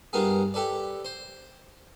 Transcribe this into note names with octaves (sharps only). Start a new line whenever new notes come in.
G2 A#3 B3 F4 G#4
G4 A4 B4 D5
C5